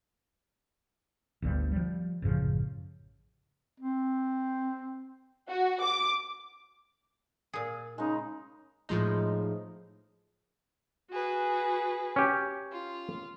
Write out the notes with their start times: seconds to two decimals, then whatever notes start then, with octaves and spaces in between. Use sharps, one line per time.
1.42 G1 D2 G2 G3
1.72 F3 G3
2.22 A1 F#2 C#3 F3
3.80 C4
5.48 F#4
5.82 D6
7.53 A#2 G#4
7.98 C#3 G#3 D#4
8.89 A2 F3 G#3 D#4
11.10 F#4 G#4 B4
12.16 C#4 G4
12.72 F4